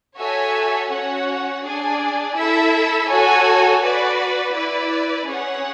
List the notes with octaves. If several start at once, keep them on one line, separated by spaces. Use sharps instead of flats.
F#4 A4 C#5 E5 G#5
C#4 F#4 C#5 F#5
D4 G#4 D5 G#5
E4 A4 E5
F#4 A4 C#5 G#5
F#4 B4 D5
E4 B4 D5
C#4 G#4 C#5 F#5